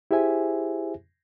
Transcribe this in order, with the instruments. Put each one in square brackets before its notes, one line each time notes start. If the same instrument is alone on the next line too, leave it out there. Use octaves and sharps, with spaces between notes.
[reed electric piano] E4 G4 G#4 C5 E5 G#5